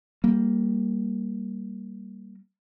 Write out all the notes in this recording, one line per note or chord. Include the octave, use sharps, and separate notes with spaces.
G3 A#3